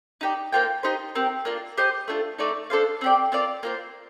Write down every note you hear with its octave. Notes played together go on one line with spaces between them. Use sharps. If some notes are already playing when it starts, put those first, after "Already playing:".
D#4 G4 D5
A#3 F4 C5 G5
D#4 G4 C5 D#5
C4 G4 A#4
A#3 D4 F4
G4 C5 D#5
A3 D4 F4
A3 D#4 A4 D5
D4 A4 C5 F5
C4 G4 D5
C4 F4 A#4 D5
A#3 F4 A4 C5